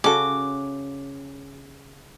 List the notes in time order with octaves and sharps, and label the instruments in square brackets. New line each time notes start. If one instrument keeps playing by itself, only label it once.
[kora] C#3 F#4 [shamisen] C#4 A4 [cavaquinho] D6